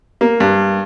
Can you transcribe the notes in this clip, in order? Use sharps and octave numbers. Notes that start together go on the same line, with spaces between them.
A#3
G2